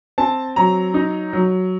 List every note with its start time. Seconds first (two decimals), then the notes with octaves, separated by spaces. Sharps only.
0.18 C4 A5
0.56 F#3 A#5
0.94 D#4
1.33 F#3